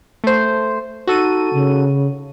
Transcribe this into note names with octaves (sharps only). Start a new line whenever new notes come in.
A3 C5
D#4 F#4 A4 D#7
C#3